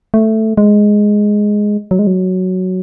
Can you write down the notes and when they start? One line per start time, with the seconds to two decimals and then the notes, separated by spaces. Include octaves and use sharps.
0.14 A3
0.57 G#3
1.91 F#3
1.99 G#3
2.07 F#3